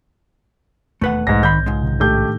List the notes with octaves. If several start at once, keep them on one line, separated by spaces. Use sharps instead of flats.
E1 D#2 A3 B4 F#5
E1 B1 G#2 A#6
G#1 D#3 B5 G6
C#2 G#2 G#3
C3 D#3
A2 D#3 A3 D4 G4 G6